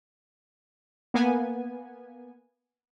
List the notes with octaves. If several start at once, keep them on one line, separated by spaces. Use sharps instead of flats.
A#3 B3 G#5